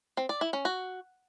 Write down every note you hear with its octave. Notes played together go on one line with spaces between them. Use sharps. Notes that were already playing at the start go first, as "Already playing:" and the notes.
C4
D5
E4
C#4
F#4